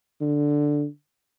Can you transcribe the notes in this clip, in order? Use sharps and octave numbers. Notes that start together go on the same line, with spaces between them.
D3